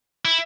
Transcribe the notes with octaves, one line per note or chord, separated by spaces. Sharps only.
E4